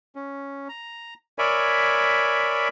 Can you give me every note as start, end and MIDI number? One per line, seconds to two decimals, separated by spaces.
0.15 0.68 61
0.69 1.14 82
1.38 2.68 70
1.38 2.68 73
1.38 2.68 74
1.38 2.68 76
1.38 2.68 80
1.38 2.68 83